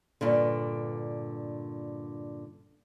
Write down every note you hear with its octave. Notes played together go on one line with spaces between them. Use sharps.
G2 A#2 D3